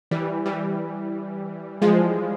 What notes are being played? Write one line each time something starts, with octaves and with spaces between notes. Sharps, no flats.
E3 G3
E3 G3
F3 G#3